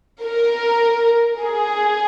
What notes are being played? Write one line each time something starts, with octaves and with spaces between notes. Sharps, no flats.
A#4
G#4